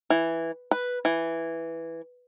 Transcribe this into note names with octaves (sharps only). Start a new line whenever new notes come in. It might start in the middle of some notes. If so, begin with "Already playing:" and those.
E3
B4
E3